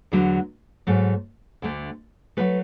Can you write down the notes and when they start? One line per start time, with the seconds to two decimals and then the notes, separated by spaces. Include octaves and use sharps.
0.12 E2 D3 F#3 A3
0.87 G#2 F#3 A3
1.62 D2 D3 A3
2.37 D3 F#3 A3 B4